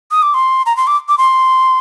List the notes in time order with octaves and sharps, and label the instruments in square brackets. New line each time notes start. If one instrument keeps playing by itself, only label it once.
[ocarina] D#6
D6
C6
A#5
C6
D6
D6
C6